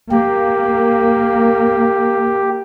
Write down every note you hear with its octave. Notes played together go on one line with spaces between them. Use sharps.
A#3 G4